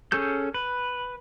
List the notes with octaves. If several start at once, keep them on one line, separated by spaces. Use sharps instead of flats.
C#4 G#4 A4 G6
B4